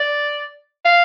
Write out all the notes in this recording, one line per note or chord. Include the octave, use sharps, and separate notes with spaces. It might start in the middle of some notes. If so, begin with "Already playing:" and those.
Already playing: D5
F5